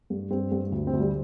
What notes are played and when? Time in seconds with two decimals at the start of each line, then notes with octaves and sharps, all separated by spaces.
0.10 G2
0.31 G2 C4
0.52 G2
0.72 D2
0.87 C4
0.93 D2
1.00 G3